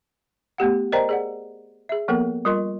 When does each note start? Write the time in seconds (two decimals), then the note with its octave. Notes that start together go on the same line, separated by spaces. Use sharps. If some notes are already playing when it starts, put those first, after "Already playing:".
0.58 A3 B3 G4 F#5
0.92 A#4 C5 D5 D#5 G5 A#5
1.09 G#4 D5 F#5
1.89 G#4 E5
2.08 F3 A#3 B3 A4 A#4
2.45 G3 F4 A#4 D#5 C6